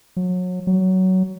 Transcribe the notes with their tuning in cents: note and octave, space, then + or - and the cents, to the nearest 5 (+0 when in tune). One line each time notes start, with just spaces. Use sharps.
F#3 -30
F#3 +15